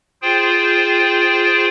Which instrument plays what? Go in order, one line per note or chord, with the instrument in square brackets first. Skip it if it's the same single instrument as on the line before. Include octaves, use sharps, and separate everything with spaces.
[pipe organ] F4 G#4 C5 G5